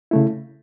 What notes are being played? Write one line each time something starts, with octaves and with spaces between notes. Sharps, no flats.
C#3 A3 E4